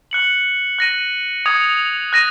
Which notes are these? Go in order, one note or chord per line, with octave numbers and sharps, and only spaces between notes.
F#6 C#7 F#7
F#6 A#6 D#7
D#6 G#6 C#7 F7
F#6 A#6 D#7